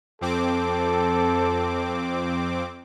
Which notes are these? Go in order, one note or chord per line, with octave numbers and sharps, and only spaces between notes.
F2 C4 A4 D6